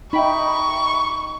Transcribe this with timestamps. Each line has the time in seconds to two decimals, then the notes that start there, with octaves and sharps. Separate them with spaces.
0.13 D#4 E5 G5 B5 C#6